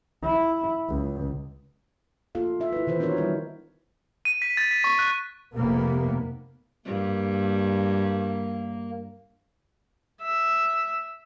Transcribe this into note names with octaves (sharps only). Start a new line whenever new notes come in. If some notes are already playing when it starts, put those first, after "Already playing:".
E4
C#2
A#3 F4 A4 F5
D#4 E5
E4 B4
D#3 E3 B4 C5
B3 D4 D#4 F#4 A#4 C#5
G3 E4 F#4 C5
D#7
B6
A6
B6
C#6
F#6
F1 C3 A#3 B3
G2 A#3
E5